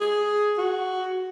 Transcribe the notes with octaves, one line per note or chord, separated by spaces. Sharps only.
G#4
F#4